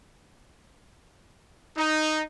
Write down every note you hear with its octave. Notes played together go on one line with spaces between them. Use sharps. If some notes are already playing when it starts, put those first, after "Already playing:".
D#4